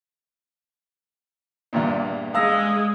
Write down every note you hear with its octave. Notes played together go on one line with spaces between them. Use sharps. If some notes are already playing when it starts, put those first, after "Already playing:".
E2 G2 A#2
G#3 F5 D#6 E6 A#6